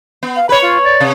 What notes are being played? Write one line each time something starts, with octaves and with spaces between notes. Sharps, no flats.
B3
F5
B4 C#5 B5
F4
D5
C3